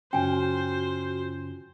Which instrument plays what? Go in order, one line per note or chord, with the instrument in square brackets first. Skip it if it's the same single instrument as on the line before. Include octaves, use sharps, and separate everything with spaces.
[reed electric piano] F#2 C#3 C#4 [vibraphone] F4 F#4 [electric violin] C5 [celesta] G5 G#5